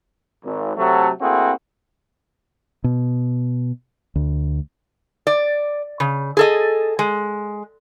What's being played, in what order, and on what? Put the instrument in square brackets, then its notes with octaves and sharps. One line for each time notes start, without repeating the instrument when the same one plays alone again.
[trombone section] G#1
C3 F#3 A3
A3 A#3 C4 E4 F#4 G#4
[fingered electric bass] B2
D2
[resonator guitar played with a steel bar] D5
C#3
G#4 A4 D#5
G#3